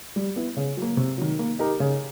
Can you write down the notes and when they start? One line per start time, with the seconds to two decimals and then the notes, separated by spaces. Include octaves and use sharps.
0.16 G3
0.36 B3 E4
0.57 C#3
0.77 F#3 A#3
0.97 C3
1.18 D#3 F#3
1.39 A#3
1.59 D#4 G4 A#4
1.80 C#3